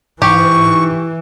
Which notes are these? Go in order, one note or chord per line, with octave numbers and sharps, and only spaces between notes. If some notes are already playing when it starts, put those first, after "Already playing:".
G#2 E3 G4 C#6